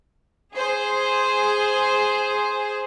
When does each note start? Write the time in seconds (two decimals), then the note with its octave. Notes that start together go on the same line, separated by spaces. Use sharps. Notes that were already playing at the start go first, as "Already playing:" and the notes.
0.55 G#4 C5